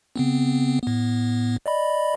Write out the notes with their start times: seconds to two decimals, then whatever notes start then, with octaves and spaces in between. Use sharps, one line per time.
0.16 C#3 B3 C4
0.83 A2 B3
1.66 D5 D#5 B5